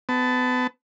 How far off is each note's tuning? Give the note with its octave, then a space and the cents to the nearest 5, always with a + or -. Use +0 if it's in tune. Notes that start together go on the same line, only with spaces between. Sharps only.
B3 +30 A5 +0